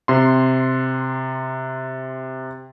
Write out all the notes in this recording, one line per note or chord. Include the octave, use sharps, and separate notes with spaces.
C3 C6